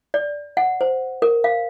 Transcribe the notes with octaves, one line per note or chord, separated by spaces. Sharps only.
D5
F#5
C5
A#4
F5